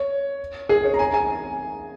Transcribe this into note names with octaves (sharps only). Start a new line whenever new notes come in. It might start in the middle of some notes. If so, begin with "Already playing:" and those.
Already playing: C#5
G#4
C#5
A#5
G#5
G#5